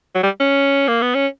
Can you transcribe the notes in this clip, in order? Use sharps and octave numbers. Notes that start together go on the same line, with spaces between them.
F#3
G3
C#4
A#3
B3
C#4